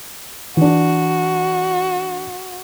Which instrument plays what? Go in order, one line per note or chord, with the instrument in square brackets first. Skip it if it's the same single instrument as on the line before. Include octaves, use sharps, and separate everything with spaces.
[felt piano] E3 D4 [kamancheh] F#4